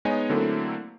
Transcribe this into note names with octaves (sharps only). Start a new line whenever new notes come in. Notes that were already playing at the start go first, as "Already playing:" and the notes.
G#3 B3 D#4 C#5 D#5 G#5
D3 F#3 A3 A#3 C4 E4